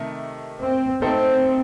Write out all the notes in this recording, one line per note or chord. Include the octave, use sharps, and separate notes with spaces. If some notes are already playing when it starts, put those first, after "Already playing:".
Already playing: C3 D#3 A3
C4
A3 C4 D#4 A4 C5